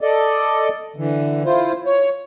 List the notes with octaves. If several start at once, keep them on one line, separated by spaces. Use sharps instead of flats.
A4 D5 D#5
D3 E3
E4 F4 C5
C#5